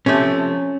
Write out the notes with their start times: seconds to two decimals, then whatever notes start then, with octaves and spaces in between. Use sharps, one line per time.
0.06 C3 F3 A3 C#4